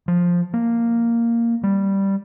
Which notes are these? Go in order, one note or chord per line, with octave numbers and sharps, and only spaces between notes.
F3
A#3
G3